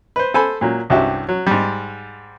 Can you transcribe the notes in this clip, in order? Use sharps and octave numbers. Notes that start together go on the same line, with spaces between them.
B4 C5
A4 C5 G#5 B5
A#2 F#3
C2 G2 C#4 F#4 G4 E5
F#3
G#2 G3